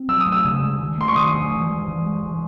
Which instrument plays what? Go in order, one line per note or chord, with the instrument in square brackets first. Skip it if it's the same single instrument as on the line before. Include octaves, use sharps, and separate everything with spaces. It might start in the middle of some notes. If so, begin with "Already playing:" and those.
Already playing: [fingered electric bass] C4
[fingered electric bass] F#3 [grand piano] E6
[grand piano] D#6
[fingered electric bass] A3
[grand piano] E6
[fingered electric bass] C#3
G#3
D#3
[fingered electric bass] A3 [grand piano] C6
[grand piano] C#6
[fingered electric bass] D#3 [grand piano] D#6
[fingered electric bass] A3
E3
G#3
E3
G#3
E3